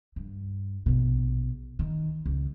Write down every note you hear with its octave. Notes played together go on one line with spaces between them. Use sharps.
G2
A#1 B2
D#3
C#2